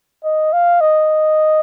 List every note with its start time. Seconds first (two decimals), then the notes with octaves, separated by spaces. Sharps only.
0.24 D#5
0.53 F5
0.81 D#5